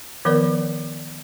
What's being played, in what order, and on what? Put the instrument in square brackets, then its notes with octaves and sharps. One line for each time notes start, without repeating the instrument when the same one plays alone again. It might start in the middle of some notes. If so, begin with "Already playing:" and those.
[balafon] D#3 F3 B3 A#4 B4 D5